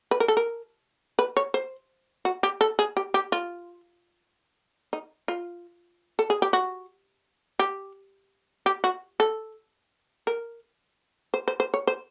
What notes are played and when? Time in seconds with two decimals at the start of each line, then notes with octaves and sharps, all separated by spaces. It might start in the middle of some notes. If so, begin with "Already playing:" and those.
0.11 B4
0.20 A#4
0.28 A4
0.37 A#4
1.19 B4
1.37 C#5
1.54 C5
2.25 F#4
2.43 G4
2.61 A4
2.79 G#4
2.97 G4
3.14 G4
3.32 F4
4.93 D#4
5.28 F4
6.19 A4
6.30 G#4
6.42 G4
6.53 F#4
7.59 G4
8.66 G4
8.84 F#4
9.20 A4
10.27 A#4
11.34 C5
11.48 C5
11.60 C5
11.74 C#5
11.87 C5